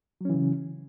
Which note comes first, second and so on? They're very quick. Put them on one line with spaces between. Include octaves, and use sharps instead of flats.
F#3 C#4 E3 C#3